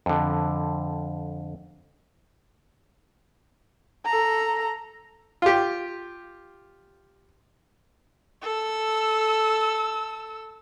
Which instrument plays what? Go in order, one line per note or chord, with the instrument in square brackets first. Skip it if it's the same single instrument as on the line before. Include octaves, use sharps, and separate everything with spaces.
[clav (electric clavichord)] F2 D3
[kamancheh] A4 A#5
[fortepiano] F4 G4
[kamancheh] A4 E6